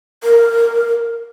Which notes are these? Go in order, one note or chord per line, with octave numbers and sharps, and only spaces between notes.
A#4